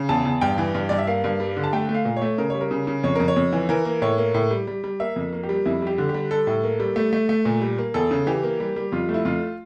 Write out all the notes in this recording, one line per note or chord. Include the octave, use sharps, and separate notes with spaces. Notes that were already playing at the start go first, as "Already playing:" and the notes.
Already playing: C#3
E2 A5
E2
G2 G5
E3
G2
G2 D5
E5
A#3 F5
G2
G3
D3
A5
A3 G5
A3
F5
A#2
C#5
A3
C#3 A#4
G3 C#5
A#4
C#3
C#3
F2 C#5
F2 A#4
C#5
F2
E3
E3 A#4
A#3
A2 C#5
A#3
A2
G3
G3
G3
A#3 E5
F2
A#3
G4
G3
F2 E4
G3 G4
D3
G4
G3
G3 A4
A2
A#3
G3
A3
A3
A3
A#2
G3
A#3
E2 A4
C#3
E3 G4
A#3
G3
G3
F2 F4
A3
E4
F2 F4